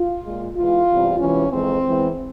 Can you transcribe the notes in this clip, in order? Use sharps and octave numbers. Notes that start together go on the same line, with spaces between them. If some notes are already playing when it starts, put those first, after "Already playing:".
Already playing: F4
A#2 G#3
E2 E3 G#3 F4
E2 C3 G3
E2 C3 E3 G#3 C#4
F2 E3 G#3 C4
E2 E3 G#3